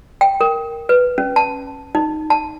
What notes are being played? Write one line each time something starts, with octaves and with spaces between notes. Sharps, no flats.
G5
A#4
B4
C#4
A5
D#4
A5